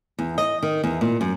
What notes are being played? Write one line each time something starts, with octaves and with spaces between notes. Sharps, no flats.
E2
D#5
D#3
E2
A#2
F#2